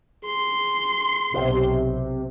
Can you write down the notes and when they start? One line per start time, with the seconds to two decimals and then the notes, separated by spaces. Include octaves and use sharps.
0.25 G#4 C6
1.34 B1 C3